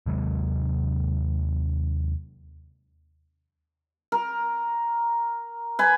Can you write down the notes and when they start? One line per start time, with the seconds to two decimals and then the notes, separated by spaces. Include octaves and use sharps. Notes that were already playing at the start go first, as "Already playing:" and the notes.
0.06 D#2 C3 F#3 G#3
4.12 A#4
5.79 B4 G#5